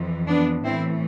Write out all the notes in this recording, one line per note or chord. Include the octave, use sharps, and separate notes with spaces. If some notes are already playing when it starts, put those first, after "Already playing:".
Already playing: F2 E3
B3 D4
A2 E3 A3 C4 E4